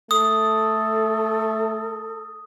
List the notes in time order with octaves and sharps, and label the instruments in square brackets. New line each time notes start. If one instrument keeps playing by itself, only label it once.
[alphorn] A3 [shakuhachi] A4 [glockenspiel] D#6